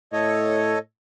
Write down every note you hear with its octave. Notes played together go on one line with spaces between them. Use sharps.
A2 A4 C#5 D#5